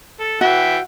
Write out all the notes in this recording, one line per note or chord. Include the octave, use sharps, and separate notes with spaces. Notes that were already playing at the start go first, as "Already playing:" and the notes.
A4
E3 F#4 E5 G5